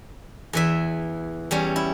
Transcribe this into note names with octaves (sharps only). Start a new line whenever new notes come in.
E2 E3 E5
E2 G3 C#4
E4